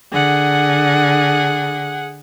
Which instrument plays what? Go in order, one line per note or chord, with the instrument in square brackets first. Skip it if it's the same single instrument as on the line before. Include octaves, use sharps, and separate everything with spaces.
[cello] D3 [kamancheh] G#4 F#5